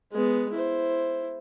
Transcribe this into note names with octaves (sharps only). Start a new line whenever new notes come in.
G#3 B3
E4 C5